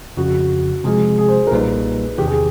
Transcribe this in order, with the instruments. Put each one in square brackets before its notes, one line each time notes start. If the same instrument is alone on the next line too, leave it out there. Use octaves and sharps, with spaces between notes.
[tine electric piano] F2 C#3 F3 [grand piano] F#4
[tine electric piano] C3 F3 G#3 [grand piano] G#4
[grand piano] G#4
C5
A#4
[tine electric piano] B1 A#2 G3 A#3 D#4 [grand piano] B4
[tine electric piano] E2 C3 D#3 [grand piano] G4
[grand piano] G#4